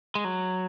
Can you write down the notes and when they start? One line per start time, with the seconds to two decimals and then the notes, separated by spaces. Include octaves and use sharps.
0.15 G#3
0.24 F#3